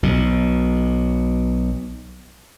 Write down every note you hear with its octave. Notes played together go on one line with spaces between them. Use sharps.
B1 B2